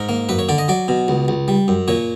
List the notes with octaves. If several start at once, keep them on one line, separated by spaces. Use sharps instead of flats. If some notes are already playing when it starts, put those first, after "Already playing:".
Already playing: G#2 A#4
A#3
F#2 B4
C#5
D3 D5
D#5
F#3 D5
B2
C#2
C#2
G3
F#2
A#2 C#5